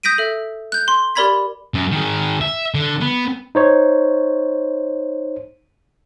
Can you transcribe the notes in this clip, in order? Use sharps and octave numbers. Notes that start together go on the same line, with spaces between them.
D#6 G6 A#6 B6 D7 D#7
A4 E5
F#6 G6
C6
G4 A#4 D5 B5 G#6 B6
F#2
D#3 G#4
E5
D3
B3
D#4 C5 C#5